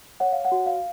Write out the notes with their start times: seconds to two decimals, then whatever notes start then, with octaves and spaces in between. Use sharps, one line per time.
0.20 C#5 F#5
0.32 F5
0.45 F#5
0.52 F#4
0.66 F5